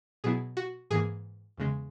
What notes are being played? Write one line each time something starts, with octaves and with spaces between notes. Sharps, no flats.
B2 F#3 B3 E4 G#4
F#4
G#2 E3 A#3 G#4
E2 C#3 G#3